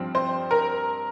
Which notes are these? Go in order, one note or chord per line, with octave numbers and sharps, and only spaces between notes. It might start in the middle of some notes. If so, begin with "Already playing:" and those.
Already playing: G2 F3 C4
C5
A#4